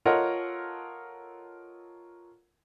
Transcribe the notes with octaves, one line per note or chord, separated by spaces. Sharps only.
F4 A4 A#4 C#5 D#5 F#5